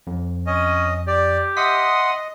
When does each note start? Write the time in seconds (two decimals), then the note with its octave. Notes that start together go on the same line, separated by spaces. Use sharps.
0.07 F2
0.47 C#4 D#5
1.07 G4 D5
1.57 D#5 E5 F#5 C6 D#6 B6